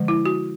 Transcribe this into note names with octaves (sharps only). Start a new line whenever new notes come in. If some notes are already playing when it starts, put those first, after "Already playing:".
Already playing: D3 F3 G#3
E4
F#4